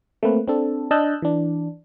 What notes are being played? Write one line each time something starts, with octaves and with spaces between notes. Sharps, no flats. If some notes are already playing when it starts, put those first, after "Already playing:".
A3 A#3 C4 B4
C4 D4 A4
D4 D#5 A5 E6 F#6 G6
E3 D4